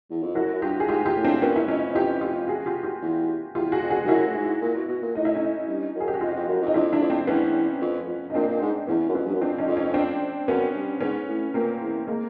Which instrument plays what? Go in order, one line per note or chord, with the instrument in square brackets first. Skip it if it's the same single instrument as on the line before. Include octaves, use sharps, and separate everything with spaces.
[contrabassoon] E2
F2
[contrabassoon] F#2 [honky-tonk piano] E4 F#4
[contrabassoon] F#2
[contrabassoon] G2 [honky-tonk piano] F4 G4
[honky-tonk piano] G#4
[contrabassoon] G#2 [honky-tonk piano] F4 G4
[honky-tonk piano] F4 G4
[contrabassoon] A2
[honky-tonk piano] C4 D4
[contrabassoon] A#2 [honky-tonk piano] B3 C#4
[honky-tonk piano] E4
[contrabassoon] F2 [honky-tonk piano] C#4 D#4
[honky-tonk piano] F4 G4
F4 G4
F#4 G#4
F4 G4
F4 G4
[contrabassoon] E2
[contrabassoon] E2 [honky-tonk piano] F4 G4
[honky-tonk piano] F#4 G#4
[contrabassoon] F2
[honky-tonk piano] F#4 G#4
[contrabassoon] G2
[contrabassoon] F#2 [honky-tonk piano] E4 F#4
[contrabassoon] A2
G#2
A#2
B2
B2
A#2
[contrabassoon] A2 [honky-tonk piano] D#4
[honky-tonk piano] E4
C#4 D#4
[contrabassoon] G2
F#2
[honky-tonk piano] G#4
G4
F#4
[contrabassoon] F2 [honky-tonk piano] D#4 F4
[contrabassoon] F2
F#2
F2
[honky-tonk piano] D#4
[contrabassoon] F2 [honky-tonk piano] D4 E4
[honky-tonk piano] D4 E4
[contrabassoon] F2
[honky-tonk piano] C4 D4
[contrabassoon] E2 [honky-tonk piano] B3 C#4
[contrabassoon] F2
F2
[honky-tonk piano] D#4
[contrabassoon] A#2 [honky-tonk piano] C4 D4
[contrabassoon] A#2
G#2
[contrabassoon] E2 [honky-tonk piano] B3 C#4
[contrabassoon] F#2
[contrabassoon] F2 [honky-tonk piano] B3 C#4
[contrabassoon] G2
F#2
[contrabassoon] F2 [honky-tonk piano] C4 D4
[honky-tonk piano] C#4 D#4
[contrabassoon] F2
[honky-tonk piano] C#4 D#4
C4 D4
[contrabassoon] F#2 [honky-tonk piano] B3 C#4
[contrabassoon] G2
[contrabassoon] G#2 [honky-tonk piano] B3 C#4
[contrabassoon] A2
[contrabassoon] A#2 [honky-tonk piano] A#3 C4
[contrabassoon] E2
[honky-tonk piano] G#3 A#3